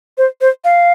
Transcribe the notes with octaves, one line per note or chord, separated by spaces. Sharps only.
C5
C5
F5